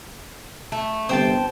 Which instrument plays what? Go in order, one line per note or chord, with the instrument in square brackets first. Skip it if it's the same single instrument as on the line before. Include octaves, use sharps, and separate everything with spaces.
[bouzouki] A3
[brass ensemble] G1 C3 [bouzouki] C5 G5 A5